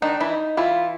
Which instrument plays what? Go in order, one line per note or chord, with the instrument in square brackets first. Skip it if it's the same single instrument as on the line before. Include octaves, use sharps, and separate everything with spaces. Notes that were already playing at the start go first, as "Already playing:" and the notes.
[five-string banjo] D#3 D#4 [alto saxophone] D4
[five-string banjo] E3 E4
[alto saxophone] D#4
[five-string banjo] E3 E4 [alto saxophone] F4